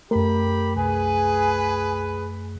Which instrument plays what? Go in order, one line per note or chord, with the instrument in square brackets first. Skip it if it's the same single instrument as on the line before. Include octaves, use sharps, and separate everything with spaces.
[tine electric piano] F#2 A3 [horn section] G4 B5 [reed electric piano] A#4
[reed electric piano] C2 [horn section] G#4 B4 [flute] G#5